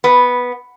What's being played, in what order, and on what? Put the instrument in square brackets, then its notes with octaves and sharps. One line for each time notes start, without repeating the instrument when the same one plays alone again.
[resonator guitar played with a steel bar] B3